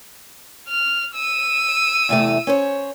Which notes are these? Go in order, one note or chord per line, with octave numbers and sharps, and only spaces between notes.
F6
E6 D#7
E2 C3 A3
C#4 C5 C#5